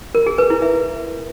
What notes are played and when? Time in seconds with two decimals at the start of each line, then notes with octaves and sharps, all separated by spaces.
0.15 A#4
0.26 G#4
0.38 B4
0.50 E4
0.62 E5